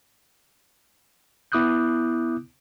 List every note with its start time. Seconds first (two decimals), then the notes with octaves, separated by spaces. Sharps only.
1.52 B3 E4 D6 D#6 F#6 G6